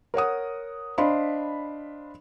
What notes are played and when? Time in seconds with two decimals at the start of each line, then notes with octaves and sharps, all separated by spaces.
0.14 A#4 C#5 F#5 D#6
0.98 D4 C5 D#5 F5 B5 C6